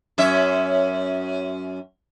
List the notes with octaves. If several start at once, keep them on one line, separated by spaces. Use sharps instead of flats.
F#2 C#4 E5